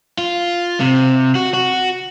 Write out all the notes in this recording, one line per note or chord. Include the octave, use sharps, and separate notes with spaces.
F4
C3
F#4
F#4